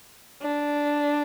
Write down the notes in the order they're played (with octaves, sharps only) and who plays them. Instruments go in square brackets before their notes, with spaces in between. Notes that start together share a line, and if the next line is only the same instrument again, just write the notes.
[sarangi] D4